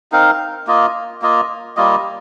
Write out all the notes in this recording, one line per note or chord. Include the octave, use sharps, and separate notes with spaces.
C4 D#4 A#4 F5
A#3 F4 D#5
A#3 F4 D#5
G3 A#3 F4 D#5